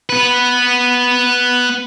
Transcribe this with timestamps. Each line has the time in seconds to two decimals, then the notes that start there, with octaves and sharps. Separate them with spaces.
0.10 B3 B4